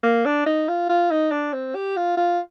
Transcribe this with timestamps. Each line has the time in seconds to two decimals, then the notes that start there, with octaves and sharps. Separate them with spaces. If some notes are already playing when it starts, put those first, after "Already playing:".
0.03 A#3
0.25 D4
0.46 D#4
0.68 F4
0.89 F4
1.11 D#4
1.32 D4
1.53 C4
1.75 G4
1.97 F4
2.17 F4